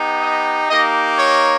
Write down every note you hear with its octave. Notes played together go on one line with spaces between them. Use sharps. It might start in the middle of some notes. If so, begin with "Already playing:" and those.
Already playing: B3 D#4 G4
D#5
A#3 D#4 G4 D#5
C#5